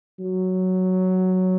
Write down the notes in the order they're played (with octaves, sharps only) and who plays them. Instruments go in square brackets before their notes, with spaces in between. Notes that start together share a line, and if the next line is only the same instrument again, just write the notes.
[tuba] F#3